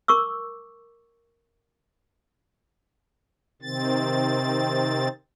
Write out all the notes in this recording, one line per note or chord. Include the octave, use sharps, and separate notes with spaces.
A#4 C#6 D6 E6
C3 D#3 C4 A6